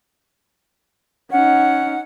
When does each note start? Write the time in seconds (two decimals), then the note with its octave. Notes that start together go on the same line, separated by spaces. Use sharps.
1.31 C#4 D#4 F#5